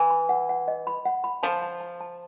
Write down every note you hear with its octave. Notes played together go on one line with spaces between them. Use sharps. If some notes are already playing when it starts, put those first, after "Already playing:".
Already playing: E3
B5
F#5
F#5
D#5
B5
F#5
B5
F3 A5
A5
A5
A5